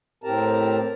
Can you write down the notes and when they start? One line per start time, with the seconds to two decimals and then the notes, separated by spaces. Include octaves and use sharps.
0.24 A2 C4 G4 A#4 A5 A#5